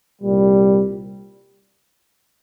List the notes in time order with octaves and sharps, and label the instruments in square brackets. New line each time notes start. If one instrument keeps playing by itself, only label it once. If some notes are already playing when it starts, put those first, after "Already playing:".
[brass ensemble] C2 A#2 G3